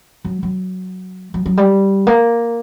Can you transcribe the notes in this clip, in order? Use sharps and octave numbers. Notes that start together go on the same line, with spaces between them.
F#3
F#3
F#3
F#3
G3
A#3